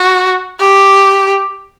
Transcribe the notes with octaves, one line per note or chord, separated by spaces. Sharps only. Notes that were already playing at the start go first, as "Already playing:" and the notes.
Already playing: F#4
G4